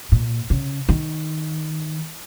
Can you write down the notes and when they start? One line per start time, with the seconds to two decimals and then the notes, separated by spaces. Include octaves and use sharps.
0.12 A#2
0.50 C#3
0.89 D#3